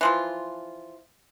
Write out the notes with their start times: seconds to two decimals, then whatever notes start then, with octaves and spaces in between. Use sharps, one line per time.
0.01 E3 F3 F4